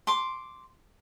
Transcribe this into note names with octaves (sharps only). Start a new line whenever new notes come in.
C6 D6